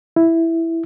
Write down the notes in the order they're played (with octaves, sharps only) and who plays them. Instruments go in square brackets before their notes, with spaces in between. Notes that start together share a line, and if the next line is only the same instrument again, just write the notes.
[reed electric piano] E4